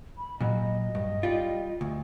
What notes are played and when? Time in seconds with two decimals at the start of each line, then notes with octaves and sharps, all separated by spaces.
0.18 B5
0.40 A#2 F#3 D#5
0.95 G2
1.23 G3 F4
1.81 D2